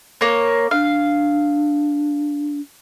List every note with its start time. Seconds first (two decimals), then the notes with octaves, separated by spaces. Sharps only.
0.21 A#3 C#5
0.71 D4 F5